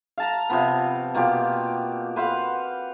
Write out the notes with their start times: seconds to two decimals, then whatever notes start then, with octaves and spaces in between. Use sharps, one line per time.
0.18 F5 A5 A#5
0.50 C3 F3 B3
1.14 B2 A#3 F4 G4
2.16 B4 C5 F5 F#5